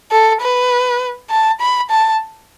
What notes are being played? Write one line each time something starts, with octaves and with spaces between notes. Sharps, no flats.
A4
B4
A5
B5
A5